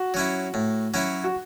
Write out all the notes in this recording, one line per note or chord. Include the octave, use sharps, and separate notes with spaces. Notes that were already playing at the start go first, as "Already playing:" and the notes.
Already playing: F#4
F#3 C#4 E4
A2
F#3 C#4 E4
F#4